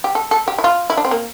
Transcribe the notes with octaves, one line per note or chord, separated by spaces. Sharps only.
G4
A4
A4
G4
E4
F4
E4
D4
C4
A#3